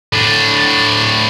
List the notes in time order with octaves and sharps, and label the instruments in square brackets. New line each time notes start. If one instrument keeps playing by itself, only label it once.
[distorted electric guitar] A2 D4